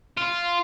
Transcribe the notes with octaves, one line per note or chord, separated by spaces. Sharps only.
F4